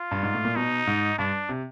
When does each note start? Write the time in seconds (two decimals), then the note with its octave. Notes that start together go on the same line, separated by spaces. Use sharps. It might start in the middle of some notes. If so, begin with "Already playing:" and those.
Already playing: F4
0.11 G2
0.23 G#2
0.34 A2
0.45 A#2
0.56 B2 D#4
0.87 G#2
1.19 G2 D4
1.49 C3